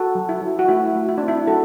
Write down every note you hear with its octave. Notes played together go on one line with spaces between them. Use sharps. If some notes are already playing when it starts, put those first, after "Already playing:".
Already playing: F#4 A4
F#3
E4
F#3
F#4
A3 E4
A3
E4
C4 D4
E4
F#3 F#4 A4